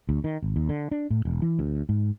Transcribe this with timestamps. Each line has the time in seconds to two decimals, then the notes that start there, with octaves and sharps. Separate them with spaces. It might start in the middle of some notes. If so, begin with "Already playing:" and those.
0.09 D2
0.24 D#3
0.42 G#1
0.56 D#2
0.69 D3
0.91 D4
1.10 A2
1.25 E1
1.42 E3
1.59 D2
1.89 G#2